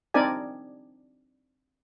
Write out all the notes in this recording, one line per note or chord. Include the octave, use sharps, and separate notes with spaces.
C4 D4 D#4 A#4 D5 G#5